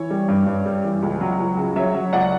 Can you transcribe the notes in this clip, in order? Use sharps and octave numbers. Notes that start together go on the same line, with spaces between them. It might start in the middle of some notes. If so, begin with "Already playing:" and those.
Already playing: E3 C#5
G3
G2
G2
G3
E3
C#2
F#3
C#2
C#3
F#3 C#5 E5
F#3
C#2 D5 F#5